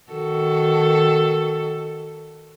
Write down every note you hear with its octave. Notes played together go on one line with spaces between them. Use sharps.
D#3 F#4 A4